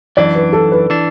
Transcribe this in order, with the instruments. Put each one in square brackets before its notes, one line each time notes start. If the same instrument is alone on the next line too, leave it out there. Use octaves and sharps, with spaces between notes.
[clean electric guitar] F#2 E3 D4 [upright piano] D5
[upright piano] B4
A4
B4
[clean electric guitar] E3 D4